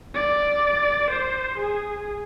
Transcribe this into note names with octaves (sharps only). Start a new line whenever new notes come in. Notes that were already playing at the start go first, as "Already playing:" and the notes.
D5
C5
G#4